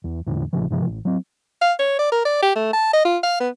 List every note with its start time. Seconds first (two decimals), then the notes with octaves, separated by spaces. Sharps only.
0.04 E2
0.26 E2 A2 D3
0.53 A#1 A2 C#3 F3
0.71 G2 C3 F3
0.86 A1
1.05 F#3 C4
1.61 F5
1.79 C#5
1.99 D5
2.12 A#4
2.25 D5
2.42 G4
2.56 A3
2.73 A5
2.93 D#5
3.05 F4
3.23 F5
3.40 B3